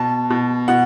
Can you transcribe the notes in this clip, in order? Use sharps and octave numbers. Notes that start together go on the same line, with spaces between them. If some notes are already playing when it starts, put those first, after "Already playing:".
Already playing: B2 A5
B2
B2 F#5